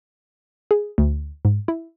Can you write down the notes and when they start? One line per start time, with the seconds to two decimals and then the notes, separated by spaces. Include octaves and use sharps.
0.71 G#4
0.98 D2
1.45 G#2
1.68 E4